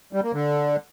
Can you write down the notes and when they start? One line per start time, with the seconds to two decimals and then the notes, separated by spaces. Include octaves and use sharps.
0.13 G3
0.23 A#3
0.33 D3